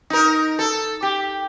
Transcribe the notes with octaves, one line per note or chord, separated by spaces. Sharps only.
D#4 A#4
A4
G4